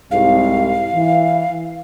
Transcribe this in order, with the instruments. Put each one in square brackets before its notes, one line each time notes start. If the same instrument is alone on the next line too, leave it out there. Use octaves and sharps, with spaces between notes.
[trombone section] C2 G#2 [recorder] F5
[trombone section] E3